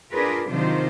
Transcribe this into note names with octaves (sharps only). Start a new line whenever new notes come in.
D4 F4 G#4 A#4 B4
C3 D#3 F#3 D4 F4 C5